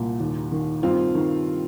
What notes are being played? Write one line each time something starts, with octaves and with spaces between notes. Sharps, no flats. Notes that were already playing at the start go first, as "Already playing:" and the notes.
Already playing: C2 A#2
D#2
D#3
G2 C4 F4
D#3